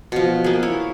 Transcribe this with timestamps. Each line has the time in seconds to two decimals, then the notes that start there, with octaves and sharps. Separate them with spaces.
0.12 B2 F3
0.44 A#3 G#4
0.63 E4 C#5